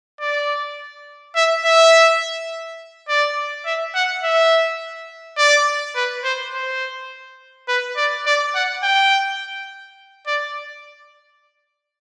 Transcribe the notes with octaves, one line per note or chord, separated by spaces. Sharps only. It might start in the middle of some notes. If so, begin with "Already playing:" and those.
D5
E5
E5
D5
E5
F#5
E5
D5
B4
C5
C5
B4
D5
D5
F#5
G5
D5